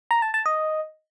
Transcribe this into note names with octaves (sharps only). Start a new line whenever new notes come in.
A#5
A5
A5
D#5